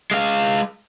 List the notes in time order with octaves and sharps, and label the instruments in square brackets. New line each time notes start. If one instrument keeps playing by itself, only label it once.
[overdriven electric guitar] G#3 F5